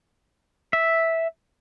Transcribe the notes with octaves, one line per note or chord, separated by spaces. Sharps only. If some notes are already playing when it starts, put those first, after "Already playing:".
E5